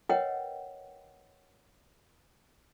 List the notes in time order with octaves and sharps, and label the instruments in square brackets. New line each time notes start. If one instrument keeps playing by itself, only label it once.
[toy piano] A#4 B4 C#5 D#5 F#5 G5